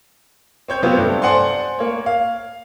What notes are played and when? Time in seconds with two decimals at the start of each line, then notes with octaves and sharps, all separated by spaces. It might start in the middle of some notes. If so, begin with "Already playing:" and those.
0.68 C4 C#5 G6
0.83 C3 F#3 B3 F4 C5
0.97 G2 A3
1.22 C5 D5 F#5 G#5 A5 C6
1.79 A#3 C#5
2.06 F5